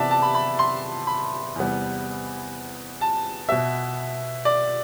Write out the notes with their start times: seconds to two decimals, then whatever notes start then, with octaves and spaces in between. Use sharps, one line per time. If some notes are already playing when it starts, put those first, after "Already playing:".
Already playing: C3 E3 B3 D5 E5 A5
0.11 A5
0.22 B5
0.35 B5
0.59 C6
1.07 B5
1.56 E2 C3 G3 B3
3.01 A5
3.49 B2 B3 E5
4.45 D5